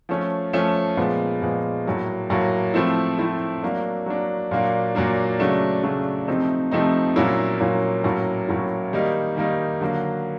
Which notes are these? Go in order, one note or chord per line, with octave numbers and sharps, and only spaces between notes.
F3 A3 C#4
F3 A3 C#4
A#2 F3 G#3 B3
A#2 F3 G#3 B3
A2 F#3 A#3
A2 F#3 A#3
F3 A3 C4 E4
F3 A3 C4 E4
F#3 A#3 D4
F#3 A#3 D4
A#2 F#3 A#3 D4
A#2 F#3 A#3 D4
C#3 F#3 A3 D4
C#3 F#3 A3 D4
C3 F3 A3 C4 D#4
C3 F3 A3 C4 D#4
A#2 F#3 A#3 C#4 E4
A#2 F#3 A#3 C#4 E4
A2 F#3 A#3 C#4 E4
A2 F#3 A#3 C#4 E4
D#3 G3 A#3 D#4
D#3 G3 A#3 D#4
D3 F#3 A#3